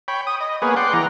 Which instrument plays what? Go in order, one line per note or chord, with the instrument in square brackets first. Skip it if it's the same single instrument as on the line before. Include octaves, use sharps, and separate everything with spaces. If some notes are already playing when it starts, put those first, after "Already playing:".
[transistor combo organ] C#5 G5 B5
D#6
D#5
A#3 B3 G#4 B4 C#5
D5 F#5 G5 C6
E3 A#5